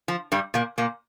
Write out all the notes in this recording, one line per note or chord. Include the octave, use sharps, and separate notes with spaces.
F3
G2 G3
A#2 A#3
A#2 A#3